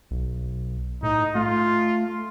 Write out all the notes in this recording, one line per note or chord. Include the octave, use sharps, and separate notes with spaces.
B1
A2 D#4
A3 F4